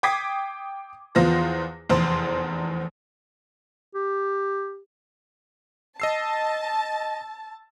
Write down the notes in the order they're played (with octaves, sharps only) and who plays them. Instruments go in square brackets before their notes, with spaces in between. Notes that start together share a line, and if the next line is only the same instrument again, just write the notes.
[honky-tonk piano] G5 D6 D#6 G#6 B6 C7
E2 F3 B3 C5 F5 A#6
F1 E2 C5
[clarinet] G4
[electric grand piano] D#5 E6 C7 [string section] A5